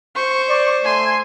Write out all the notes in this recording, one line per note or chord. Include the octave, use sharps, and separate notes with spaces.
C5 C#6
D5
A3 G#5 C6